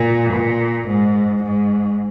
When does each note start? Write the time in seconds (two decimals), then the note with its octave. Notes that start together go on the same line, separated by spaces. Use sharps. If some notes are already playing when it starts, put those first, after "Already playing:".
Already playing: A#2
0.32 A#2
0.88 G#2
1.43 G#2